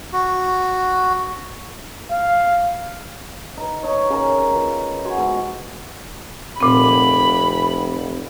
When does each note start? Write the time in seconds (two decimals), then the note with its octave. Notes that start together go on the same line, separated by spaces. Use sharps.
0.13 F#4
2.11 F5
3.57 D#4 B4
3.83 D#4 C#5
4.10 C#3 A#4
4.52 F4 B4 A#5 B5
5.05 F#4 G#5 C6
5.17 G#2 B3 B4
6.60 F1 A#2 C4 B5